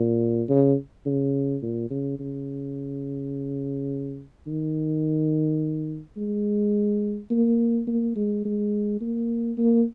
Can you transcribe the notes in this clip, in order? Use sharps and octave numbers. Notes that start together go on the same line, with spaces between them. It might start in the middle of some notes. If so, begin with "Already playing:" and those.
Already playing: A#2
C#3
C#3
A#2
C#3
C#3
D#3
G#3
A#3
A#3
G#3
G#3
A#3
A#3